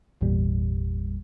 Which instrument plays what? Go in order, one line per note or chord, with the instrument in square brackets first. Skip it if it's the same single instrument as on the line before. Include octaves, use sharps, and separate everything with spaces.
[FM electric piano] G#1 E2 A#2 G3